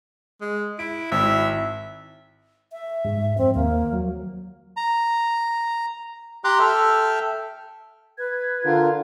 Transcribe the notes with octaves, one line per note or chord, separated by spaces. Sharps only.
G#3
E4 D7
G#1 E4 E5
E5
G#2
F2 C4
D#2 A#3
F#3
A#5
G4 A#5 C6 D6 F#6
A4 E5 G5 F6
B4 G#6
D3 F4 A#4